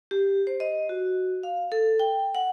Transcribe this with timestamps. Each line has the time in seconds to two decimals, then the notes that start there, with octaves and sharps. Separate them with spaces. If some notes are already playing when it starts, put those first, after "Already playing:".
0.11 G4
0.47 C5
0.60 D#5
0.89 F#4
1.43 F5
1.72 A4
1.99 G5
2.35 F#5